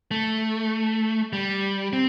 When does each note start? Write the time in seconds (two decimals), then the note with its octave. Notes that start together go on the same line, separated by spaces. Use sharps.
0.11 A3
1.33 G3
1.93 C4